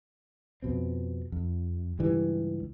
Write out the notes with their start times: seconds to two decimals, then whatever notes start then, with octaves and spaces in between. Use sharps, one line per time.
0.62 F2 B2 C4
1.32 F2
1.99 C#2 G2 E3 G3